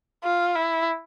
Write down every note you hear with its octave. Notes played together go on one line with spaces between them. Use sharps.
F4
E4